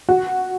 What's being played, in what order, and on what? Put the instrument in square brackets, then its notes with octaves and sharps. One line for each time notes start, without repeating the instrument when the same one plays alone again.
[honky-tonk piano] F#4